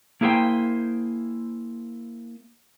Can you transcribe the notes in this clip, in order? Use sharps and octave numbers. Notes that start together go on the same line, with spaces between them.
A#3 E4 G#4 A4 C5 G5